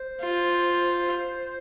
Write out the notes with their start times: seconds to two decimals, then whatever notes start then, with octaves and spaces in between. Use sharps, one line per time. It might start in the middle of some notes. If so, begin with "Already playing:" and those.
Already playing: C5
0.22 F4